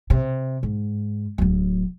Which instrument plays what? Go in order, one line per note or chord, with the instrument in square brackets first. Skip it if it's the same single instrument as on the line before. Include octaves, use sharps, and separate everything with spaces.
[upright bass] C3
G#2
D1 F#3